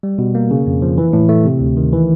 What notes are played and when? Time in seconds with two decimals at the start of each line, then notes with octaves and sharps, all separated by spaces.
0.03 G3
0.19 B2
0.35 A#3
0.51 C#3
0.67 F2
0.82 F3
0.98 E3
1.13 A2
1.29 A3
1.46 C3
1.61 D2
1.77 D#3
1.93 E3